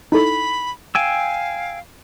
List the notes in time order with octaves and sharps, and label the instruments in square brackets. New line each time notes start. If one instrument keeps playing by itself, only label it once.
[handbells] D#4 E4 A4 [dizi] B5
[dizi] F5 [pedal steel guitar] G5 G#5 E6